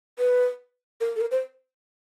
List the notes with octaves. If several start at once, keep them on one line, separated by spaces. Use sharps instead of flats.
B4
A#4
A4
A#4
C5